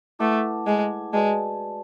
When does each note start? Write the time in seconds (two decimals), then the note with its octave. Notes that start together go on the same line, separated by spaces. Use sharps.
0.19 A3 E4 B4 F#5 A5 D6
0.67 G#3
1.13 G#3 F#4 B4 D5 A5